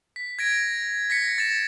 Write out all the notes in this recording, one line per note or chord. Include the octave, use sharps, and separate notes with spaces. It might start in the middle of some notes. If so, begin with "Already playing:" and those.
B6
G#6 A#6 D7
A#6 B6 C#7
A6 E7